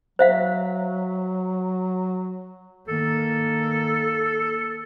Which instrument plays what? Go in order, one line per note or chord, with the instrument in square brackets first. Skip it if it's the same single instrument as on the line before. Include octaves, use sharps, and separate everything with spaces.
[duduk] F#3 [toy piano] C5 E5 F5
[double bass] D#3 A#3 [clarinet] A4